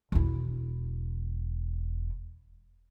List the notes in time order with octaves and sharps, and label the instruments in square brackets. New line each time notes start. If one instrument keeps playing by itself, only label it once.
[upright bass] E1 E4